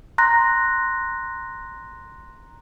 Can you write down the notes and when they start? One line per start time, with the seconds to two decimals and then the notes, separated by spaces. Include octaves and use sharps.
0.18 A#5 C6 F#6 A#6